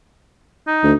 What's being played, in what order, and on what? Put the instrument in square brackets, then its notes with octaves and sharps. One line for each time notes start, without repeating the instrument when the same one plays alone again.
[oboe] D#4
[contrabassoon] D2